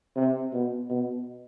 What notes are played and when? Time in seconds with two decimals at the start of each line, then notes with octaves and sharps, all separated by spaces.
0.16 C3
0.53 B2
0.90 B2